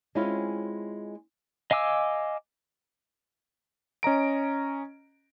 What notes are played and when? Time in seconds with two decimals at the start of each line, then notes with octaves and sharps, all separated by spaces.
0.15 G#3 C4 C#4 E4 F4
1.71 D#5 F5 G#5 D6 E6
4.03 C#4 D#5 A#5 D7